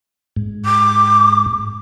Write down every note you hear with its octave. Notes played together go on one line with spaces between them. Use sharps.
G#2
D6